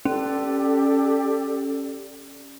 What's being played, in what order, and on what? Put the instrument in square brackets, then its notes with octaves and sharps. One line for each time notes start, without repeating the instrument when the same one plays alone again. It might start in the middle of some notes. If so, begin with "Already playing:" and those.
[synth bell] C#4 [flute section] G4 A4 D5